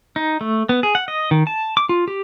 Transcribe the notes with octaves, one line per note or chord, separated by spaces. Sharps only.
D#4
A3
B3
G#4
F#5
D#5
D#3
A5
D6
F4
G4